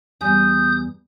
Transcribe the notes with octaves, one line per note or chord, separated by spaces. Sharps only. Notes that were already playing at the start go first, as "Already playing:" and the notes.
E2 G3 G#5 D#6 G6